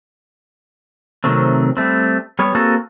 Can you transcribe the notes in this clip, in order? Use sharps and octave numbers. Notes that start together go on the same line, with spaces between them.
C3 D#3 F#3 A3 C4
G3 A3 C4
G3 B3 C#5
A#3 C4 F#4 G#4 A4